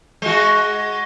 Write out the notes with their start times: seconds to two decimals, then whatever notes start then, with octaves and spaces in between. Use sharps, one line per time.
0.22 G#3 F#4